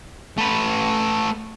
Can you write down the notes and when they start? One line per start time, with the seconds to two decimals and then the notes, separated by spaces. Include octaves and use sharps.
0.38 A3 B4